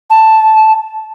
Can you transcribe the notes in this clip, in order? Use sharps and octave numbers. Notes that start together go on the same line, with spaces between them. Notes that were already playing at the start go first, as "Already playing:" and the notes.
A5